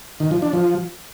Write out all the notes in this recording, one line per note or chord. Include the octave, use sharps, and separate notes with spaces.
D#3
F3
D4
F3